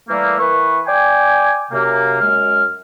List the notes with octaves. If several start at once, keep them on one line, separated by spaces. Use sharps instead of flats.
E3 G3 A3 A#3
E3 A#4 B4 C#6
D5 G5 G#5
F#2 C3 A#3
F#2 G#3 F6